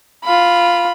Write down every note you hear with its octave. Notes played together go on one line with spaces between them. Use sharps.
F4 B5